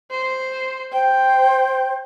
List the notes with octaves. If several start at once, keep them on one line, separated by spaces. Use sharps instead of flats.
C5
C5 G5